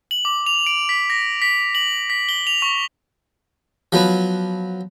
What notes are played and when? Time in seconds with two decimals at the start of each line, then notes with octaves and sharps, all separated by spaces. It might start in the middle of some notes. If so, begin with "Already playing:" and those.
0.11 F#7
0.25 D6
0.46 F7
0.66 D7
0.89 B6
1.10 A#6
1.42 B6
1.75 F#7
2.10 B6
2.29 G7
2.47 F7
2.62 C#6
3.92 F3 F#3 B3